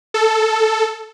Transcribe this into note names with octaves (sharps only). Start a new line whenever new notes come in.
A4